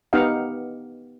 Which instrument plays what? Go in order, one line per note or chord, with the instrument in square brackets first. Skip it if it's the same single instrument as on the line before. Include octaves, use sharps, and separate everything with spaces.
[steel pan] B3 D#4 G4 D#5 F5 F#5